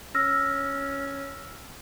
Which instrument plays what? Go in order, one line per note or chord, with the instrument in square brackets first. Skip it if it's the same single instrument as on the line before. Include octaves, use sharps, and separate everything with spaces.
[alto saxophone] C#4 [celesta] E6 F6 A#6